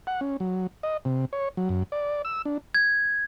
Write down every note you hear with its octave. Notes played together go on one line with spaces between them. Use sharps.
F#5
C#4
F#3
D#5
C3
C#5
F#3
F#2
D5
E6
D4
G#6